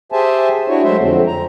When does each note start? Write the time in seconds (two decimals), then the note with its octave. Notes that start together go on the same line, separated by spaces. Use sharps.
0.12 G4 G#4 C5 E5 G#5 A5
0.68 D4 E4 F#4 C#5
0.84 F#3 G#3 A3 C5 E5
0.99 F2 D3 C4
1.27 A#5